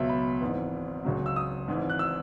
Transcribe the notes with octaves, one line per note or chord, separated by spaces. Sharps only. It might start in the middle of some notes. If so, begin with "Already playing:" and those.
Already playing: C#2 B2 F#3 E5
B5
G#1 G#2 E3
C#2 C#3 F#3
E6
D#6
G#1 G#2 E3
F#6
E6